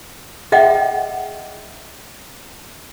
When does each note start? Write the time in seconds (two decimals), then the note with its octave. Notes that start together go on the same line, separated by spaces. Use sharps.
0.52 G#4 D#5 E5 F#5 G5